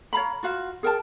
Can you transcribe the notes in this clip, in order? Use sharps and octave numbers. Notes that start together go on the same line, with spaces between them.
C#5 F5 A#5 B5
F4 F#4 F5
G#4 A#4 G5 A5